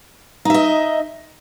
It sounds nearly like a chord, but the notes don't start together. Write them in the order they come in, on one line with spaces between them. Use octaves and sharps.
D#4 E5 D#5